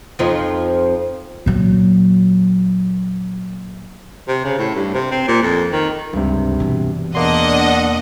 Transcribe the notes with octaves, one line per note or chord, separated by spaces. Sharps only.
F2 F3 D#4
A#2 F#3
C3
C#3
A2
G2
C3
C4
A#2
F2
D#3
C#2 G2 C3
B2 E3
E2 A#3 D4 D#5 F#5 C6